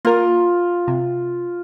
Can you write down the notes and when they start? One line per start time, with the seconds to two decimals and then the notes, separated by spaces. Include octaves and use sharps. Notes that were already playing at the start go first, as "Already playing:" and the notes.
0.05 A#3 F4 A#4
0.87 C3